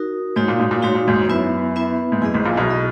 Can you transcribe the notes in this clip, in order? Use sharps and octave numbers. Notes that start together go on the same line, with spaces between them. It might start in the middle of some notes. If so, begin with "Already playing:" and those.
Already playing: D#4 F#4 A#4
G#2 D#4 F#4 C#5
A#2
G#2
A#2
G#2 D#4 F#4 C#5
A#2
G#1 G#2
F#2 B3 E4 B4 E5
B3 E4 B4 E5
G#2
F#2 E4 G#4 D#5
G#1 G#2
A#1 A#2
B1 B2
E4 G#4 D#5